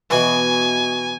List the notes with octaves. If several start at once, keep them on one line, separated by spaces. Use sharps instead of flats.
B2 E3 G#5